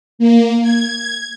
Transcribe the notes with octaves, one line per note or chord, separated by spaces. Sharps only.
A#3
G#6